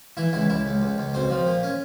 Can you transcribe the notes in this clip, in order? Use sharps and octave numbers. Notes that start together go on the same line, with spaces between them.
E3 E4
C#2 E4
C#2 E4
C#2
C#2
C#2
B1 C4
F3
A#2
C#4